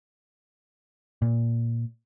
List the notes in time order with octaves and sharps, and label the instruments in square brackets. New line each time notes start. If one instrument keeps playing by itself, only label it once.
[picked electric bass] A#2